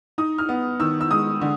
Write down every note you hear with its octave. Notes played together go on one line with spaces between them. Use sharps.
D#4 D#6
F6
B3
D#3 E6
E6
G#3 D#6
D3